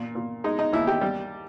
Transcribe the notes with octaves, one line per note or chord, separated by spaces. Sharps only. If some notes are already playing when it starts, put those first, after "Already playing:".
Already playing: A#2
A#2
G#3 D#4
D#4
D#2 E4
G4
G3